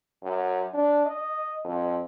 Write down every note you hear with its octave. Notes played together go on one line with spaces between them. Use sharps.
F#2
D4
D#5
F2